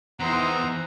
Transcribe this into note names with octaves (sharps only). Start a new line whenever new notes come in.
E2 B3 C4 D#4 E4 F#5 A#5 C6